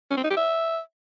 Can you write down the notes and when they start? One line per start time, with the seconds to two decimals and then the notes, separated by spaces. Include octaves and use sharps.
0.10 C#4
0.17 C4
0.23 D#4
0.30 G4
0.37 E5